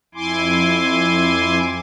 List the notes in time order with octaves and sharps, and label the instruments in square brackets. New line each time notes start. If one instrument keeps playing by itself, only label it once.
[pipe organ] F2 E4 G#5 C6 D6